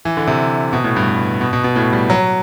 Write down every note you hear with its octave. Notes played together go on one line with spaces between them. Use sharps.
E3
D3
C3
B2
A2
G2
B2
B2
B2
A2
G3
F#3